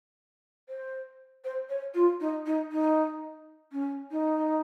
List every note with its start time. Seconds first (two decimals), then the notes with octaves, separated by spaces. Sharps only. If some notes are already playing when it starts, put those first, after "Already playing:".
0.69 C5
1.45 C5
1.69 C#5
1.94 F4
2.20 D#4
2.46 D#4
2.72 D#4
3.72 C#4
4.11 D#4